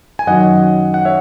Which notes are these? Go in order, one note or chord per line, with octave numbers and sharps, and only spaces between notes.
G#5
F#2 D#3 F#3 D#5 F#5
F#5
C#5 E5